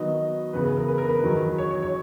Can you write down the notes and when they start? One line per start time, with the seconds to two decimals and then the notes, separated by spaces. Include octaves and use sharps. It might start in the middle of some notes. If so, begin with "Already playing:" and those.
Already playing: D#3 F#3 B3 D#4 D#5
0.53 E2 C#3 E3 B3 B4
0.65 B4
0.77 A#4
0.88 B4
0.98 A#4
1.09 B4
1.23 E2 D#3 F#3
1.58 C#5
1.71 C#5
1.83 C#5